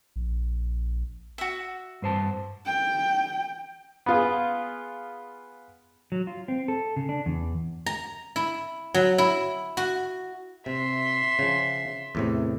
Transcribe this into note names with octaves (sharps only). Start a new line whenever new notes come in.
A#1
F#4 E5
G2 C5 A5
G5
B3 F4 G#4
F#3
F4
C4
A4
C#3
D4
E2
A#5
E4
F#3
E4
F#4
C3 E5 C6
C#3 F3
E2 A2 C3